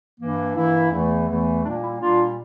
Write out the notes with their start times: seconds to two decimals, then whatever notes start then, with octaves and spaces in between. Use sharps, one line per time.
0.20 G2 E3 A#3
0.56 G2 E3 A#3 E4
0.91 E2 E3 A3
1.28 E2 E3 A3
1.63 A#2 G3 A#3 D4
1.81 E4
1.98 A#2 G3 A#3 D4 F4